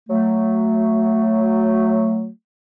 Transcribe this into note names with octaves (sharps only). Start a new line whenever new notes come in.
F#3 A3